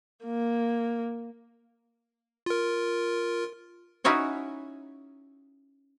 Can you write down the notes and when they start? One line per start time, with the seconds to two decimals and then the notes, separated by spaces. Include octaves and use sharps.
0.24 A#3
2.46 F4 A#4
4.04 C#4 D#4 E4 F#4 C#5 D#5